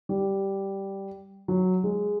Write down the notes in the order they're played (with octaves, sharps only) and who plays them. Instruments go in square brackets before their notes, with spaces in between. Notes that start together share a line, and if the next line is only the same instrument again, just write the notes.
[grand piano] G3
F#3
G#3